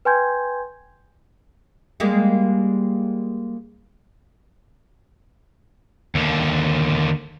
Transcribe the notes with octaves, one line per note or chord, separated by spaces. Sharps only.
B4 G5 G#5 C6 G6 G#6
G3 G#3 A#3
D#2 D3